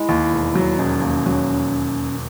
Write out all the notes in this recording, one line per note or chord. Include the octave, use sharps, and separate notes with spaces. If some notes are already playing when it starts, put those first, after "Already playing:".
Already playing: G#3 E4
D#2
E1
F#3
E1 C#4
D#2
F#3